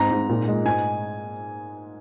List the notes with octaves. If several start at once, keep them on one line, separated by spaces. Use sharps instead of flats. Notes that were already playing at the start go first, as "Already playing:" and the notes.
Already playing: G#2 C4 A#5
G#2
A#2
G#3
G#2 G#5